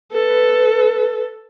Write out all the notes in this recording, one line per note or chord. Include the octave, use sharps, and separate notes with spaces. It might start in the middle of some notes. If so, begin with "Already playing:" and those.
A4 B4